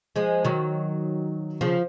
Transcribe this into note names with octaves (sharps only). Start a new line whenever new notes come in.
F3 G#3
D#3 F#3
C#3 F3